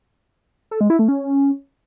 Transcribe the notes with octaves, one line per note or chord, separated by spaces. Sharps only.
A4
G#3
E4
A3
C#4